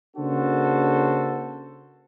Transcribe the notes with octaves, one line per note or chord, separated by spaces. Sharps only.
C#3 A#3 D4 F#4 A4 C5